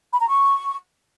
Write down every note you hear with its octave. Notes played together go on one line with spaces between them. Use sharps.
B5
A#5
C#6